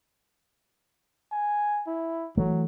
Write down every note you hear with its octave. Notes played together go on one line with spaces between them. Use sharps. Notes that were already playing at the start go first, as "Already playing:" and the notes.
G#5
E4
E3 F#3 A3